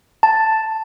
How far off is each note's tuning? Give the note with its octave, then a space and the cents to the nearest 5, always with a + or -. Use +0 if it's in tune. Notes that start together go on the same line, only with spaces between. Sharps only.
A5 +5